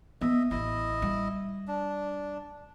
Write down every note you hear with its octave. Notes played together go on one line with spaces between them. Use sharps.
B3 D#5 E5
A1 E4 D#5
G3
D4